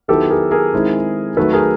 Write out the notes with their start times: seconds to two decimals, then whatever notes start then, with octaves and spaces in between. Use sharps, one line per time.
0.08 D#3 F#3 B3 E4 G4 A4
0.30 G#4 A#4
0.51 G#4 A#4
0.73 D#3 G#3 C4 E4
1.37 D#3 F#3 A3 A4 B4
1.53 G#4 A#4